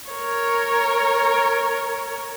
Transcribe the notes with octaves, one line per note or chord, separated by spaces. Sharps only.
A#4 C#5